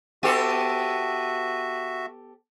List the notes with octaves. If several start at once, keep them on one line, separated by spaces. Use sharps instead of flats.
B3 F#4 G4 A4 E5